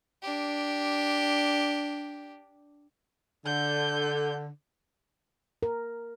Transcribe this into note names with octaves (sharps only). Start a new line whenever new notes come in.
D4 G4
D3 G6
A#4